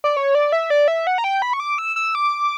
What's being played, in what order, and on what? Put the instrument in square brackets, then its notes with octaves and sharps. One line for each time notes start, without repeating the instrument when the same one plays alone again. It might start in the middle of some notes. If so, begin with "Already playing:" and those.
[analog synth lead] D5
C#5
D5
E5
D5
E5
F#5
A#5
G5
B5
C#6
D6
E6
E6
D6